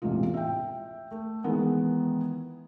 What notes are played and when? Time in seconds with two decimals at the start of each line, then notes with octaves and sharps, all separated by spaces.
0.02 E1 A1 G#2 C3 E3 F4
0.34 E5 G5
1.11 A3
1.44 D#3 E3 G#3 B3